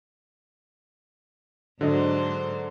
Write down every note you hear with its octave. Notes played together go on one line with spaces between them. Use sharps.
G#2 D3 F#3 D4 C5 D#5